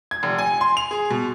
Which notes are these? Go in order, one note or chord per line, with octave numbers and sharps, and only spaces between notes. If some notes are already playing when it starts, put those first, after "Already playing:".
G#6
F1
G#5
C6
F7
G#4
B2